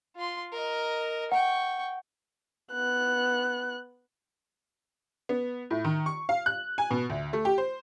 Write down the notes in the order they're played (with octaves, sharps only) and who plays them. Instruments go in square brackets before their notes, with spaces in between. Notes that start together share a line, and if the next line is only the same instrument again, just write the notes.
[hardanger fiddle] F4 C6
A#4 D#5
[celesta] F#5 [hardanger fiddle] G5 C#6
[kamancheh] B3 F#6
[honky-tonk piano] B3
A2
D#3
C#6
F5
F#6
G#5
B2
D2
A3
G4
C5